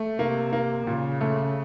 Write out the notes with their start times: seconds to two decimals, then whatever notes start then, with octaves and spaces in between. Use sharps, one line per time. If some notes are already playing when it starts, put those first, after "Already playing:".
Already playing: A3
0.19 C3 A#3
0.53 A#3
0.86 A#2 C#3
1.21 A3